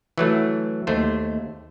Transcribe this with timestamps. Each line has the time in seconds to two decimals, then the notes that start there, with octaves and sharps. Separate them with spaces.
0.18 E3 F#3 A3
0.87 D#2 A3 C5